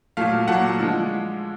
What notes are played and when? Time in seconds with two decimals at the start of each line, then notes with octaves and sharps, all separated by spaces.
0.17 A#2 F#3 A3 F5
0.48 A#2 F#3 A3 F#5
0.79 D3 F3 G#3